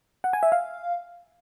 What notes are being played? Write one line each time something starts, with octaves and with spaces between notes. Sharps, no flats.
F#5
G#5
E5
F5